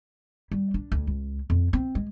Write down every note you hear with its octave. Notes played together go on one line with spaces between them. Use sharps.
G3
D4
D2
C#2
F2
C4
G#3